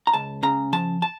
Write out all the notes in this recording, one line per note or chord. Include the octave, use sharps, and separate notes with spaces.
A#5
C#2 A5
C#3 A#5
F3 A5
A5